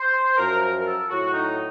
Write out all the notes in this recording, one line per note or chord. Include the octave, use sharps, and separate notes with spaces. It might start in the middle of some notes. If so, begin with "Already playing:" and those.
Already playing: C5
F#2 F3 A#4
A#4
A#4
A4
A2 F#3 F#4
D#4